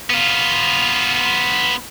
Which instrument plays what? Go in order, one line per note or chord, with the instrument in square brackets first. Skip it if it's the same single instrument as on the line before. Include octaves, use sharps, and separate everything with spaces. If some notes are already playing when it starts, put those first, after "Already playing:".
[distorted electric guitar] B3 F4